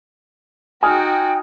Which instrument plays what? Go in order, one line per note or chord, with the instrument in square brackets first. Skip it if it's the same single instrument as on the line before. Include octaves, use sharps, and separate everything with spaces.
[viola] D#4 F#4 [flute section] G5 [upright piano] G#5 D#6 F6